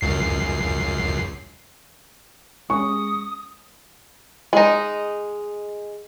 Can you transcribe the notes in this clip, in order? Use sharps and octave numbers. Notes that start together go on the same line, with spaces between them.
C#2 F#2 C7
G#3 C#4 C#6 D#6
G#3 D#4